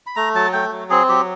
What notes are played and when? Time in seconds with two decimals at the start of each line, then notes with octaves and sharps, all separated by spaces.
0.07 B5
0.16 A3 A#5
0.35 F#3 A5
0.53 A3 G5
0.72 F#3
0.90 C4 G#4
1.09 F#3 G4